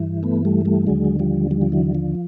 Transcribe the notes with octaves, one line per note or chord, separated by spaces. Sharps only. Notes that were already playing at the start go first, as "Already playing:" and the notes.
Already playing: G2 E3
A3 B3
G3 A3
G3 A3
D#2 D3 F#3 G#3
F3 G3
F3 G3
F3
E3 F#3
F3